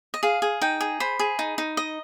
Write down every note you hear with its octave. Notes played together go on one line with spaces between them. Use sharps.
D#5
G#4 F5
G#4
D#4 G5
G#4
C5 B5
G#4
D#4
D#4
D#5